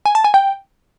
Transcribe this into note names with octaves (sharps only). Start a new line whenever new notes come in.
G#5
A5
G#5
G5